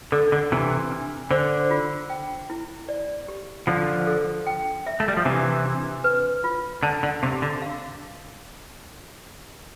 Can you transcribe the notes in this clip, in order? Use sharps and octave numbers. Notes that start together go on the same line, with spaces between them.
D3 A4
D3
C3 E3 D4
D4
D3 C5
F4
G5
E4
D5
G4
D3 F3 C6
A4
G5
E5
A3
G3
F3
C3 E3 D4
D4
B4
F4
D3 A5
D3
C3 G4
D3
F5